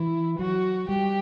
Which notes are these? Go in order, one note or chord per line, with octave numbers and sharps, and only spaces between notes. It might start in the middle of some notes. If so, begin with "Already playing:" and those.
Already playing: E3 E4
F#3 F#4
G3 G4